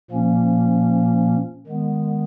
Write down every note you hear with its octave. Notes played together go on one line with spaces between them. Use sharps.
A#2 F3 A#3 C#4
D#3 G#3 B3